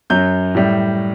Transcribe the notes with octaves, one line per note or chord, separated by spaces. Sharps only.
F#2 F#3 G6
A2 G3